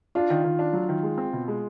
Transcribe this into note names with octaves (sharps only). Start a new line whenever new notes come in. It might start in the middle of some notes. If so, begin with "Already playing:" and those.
D4 F4
D#3
D#3
D4
F#3
D#3
G#3
C4
B2
G#3